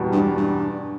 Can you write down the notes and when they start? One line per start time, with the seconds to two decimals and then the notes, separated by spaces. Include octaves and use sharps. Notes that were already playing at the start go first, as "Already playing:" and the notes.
Already playing: E2 B2 G3
0.12 G2
0.37 G2